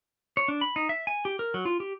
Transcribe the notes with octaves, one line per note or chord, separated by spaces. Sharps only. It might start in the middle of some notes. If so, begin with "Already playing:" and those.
C#5
D4
B5
D#4
E5
G#5
G4
A#4
F#3
F4
G4